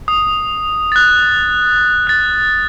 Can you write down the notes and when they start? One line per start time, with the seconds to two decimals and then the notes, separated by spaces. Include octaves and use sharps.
0.08 D#6
0.92 F#6 A6
2.07 F#6 A6